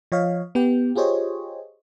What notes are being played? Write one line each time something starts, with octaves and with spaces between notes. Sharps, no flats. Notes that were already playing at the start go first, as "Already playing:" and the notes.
F3 C#5 D#5 F5
B3 G4 G5
F4 G4 G#4 C5 C#5 D#5